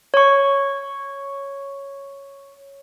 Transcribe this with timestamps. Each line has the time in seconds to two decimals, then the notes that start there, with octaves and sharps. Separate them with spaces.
0.14 C#5 C#6